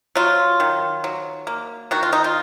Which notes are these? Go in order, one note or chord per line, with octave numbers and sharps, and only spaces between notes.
F#3 F4
D#3
F#3
A#3
D#3 F#4
F4
D#4
F4